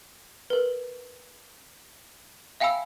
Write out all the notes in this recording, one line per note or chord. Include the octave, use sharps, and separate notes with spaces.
A#4 B4
E5 F5 G5 G#5 B5 E6